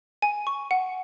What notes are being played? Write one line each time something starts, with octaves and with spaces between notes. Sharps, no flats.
G#5
C#6
F#5